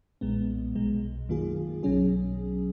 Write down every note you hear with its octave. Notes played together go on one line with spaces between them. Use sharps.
B1 A#2 G#3 B3
B1 B2 G#3
F#2 D#3 A#3 F4 G#4
B1 B2 F#3 C#4 G#4